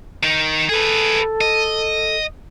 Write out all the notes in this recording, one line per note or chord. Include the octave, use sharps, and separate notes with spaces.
D#3 D#4
G#4 A4 B4
D#5